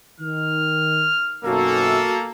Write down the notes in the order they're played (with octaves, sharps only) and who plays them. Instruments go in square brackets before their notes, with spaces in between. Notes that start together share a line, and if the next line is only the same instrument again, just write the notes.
[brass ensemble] D#3 [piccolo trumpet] F6
[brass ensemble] B1 F#2 [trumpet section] A#3 A4 [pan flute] F#4 [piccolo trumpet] E6